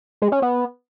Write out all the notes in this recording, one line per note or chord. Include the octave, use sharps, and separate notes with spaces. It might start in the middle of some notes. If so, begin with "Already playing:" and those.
G#3
C#4
B3